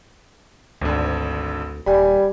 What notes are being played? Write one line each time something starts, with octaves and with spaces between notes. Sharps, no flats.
G#1 D2 D3
D#1 G3 G#5 B5